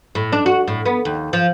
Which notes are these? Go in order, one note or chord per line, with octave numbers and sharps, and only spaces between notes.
A2
D4
F#4
A2
B3
D#2
F3